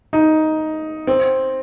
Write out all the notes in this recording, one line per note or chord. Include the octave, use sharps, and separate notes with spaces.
D#4
C4